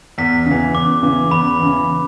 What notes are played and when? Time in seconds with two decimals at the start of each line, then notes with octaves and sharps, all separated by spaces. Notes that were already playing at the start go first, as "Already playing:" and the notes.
0.18 E2 B6
0.46 C#3 E3
0.74 E2 D6
1.03 C#3 E3
1.31 E2 B5
1.60 C#3 E3